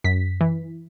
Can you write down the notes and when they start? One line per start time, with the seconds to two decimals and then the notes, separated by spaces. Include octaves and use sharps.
0.04 F#2 B6
0.41 E3